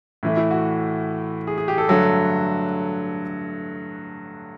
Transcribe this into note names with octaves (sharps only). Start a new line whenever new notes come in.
A2 E3 A3
E4
F#4
G#4
G#4
G4
A4
G2 D3 F#3 A3 A4